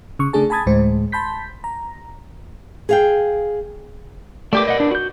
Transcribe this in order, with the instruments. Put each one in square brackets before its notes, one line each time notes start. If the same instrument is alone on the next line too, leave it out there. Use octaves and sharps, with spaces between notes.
[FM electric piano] C#3 C#6
C#3 A3 D4 G#4 A5
G#5 A5 B5 D#6 G#6 A6
D2 A2 G#3 C5
A5 B5 C6 G6 B6
A#5
[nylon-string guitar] G#4 F5 G5
[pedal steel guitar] A3 G4 D6 [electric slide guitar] A#4 B4 D5
[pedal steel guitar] D#5 F#5
D4
F#4 G6